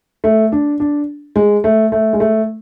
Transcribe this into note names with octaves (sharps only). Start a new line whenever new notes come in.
A3
D4
D4
G#3
A3
A3
G#3
A3